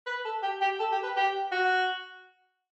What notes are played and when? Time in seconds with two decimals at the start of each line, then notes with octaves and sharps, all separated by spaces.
0.06 B4
0.25 A4
0.43 G4
0.61 G4
0.80 A4
0.92 G4
1.03 B4
1.16 G4
1.52 F#4